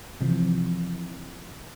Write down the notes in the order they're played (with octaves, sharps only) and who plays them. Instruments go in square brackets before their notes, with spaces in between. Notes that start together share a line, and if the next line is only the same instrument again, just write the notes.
[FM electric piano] C3 E3 F3